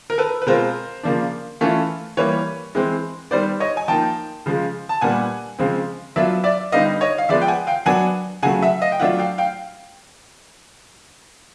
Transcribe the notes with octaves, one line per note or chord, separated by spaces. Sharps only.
A#4
A4 B4
B4
B2 G#3 C4 F4 A#4 C5
C#3 F3 A#3 D4
E3 A3 C#4 F4
E3 G3 A#3 B4 C#5
E3 G#3 C4
D#3 G3 B3 C5 D5
C#5 D#5
G#5
F3 A#3 D#4 G5 A5
C#3 F3 G#3
A5
A#2 G3 B3 D4 F#5 G#5
C#3 F3 G#3 C4
F#3 B3 D4 F4 D5 E5
D5 E5
D3 G3 B3 D#4 D#5 F5
C#5 D#5
F5
F3 G#3 B3 D5 E5
G5
F#5 G#5
F5 G5
F#3 B3 D4 F#5 G#5
C#3 F#3 A3 F#5 G#5
E5 F#5
D#5 F5
G5
F#3 A3 D4 F4 E5 F#5
F5 G5
F5 G5